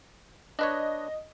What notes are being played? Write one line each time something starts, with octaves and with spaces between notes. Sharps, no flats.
D4 B4 C#5 D#5